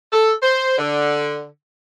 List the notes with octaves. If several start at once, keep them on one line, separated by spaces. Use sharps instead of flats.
A4
C5
D3